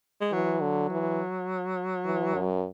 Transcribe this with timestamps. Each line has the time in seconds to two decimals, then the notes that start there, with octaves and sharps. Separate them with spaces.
0.21 G#3
0.31 E3 F#3
0.61 D3
0.90 E3
2.05 E3
2.35 F#2